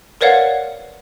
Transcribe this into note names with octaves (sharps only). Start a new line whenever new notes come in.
A#4 B4 C#5 D5 F5 F#5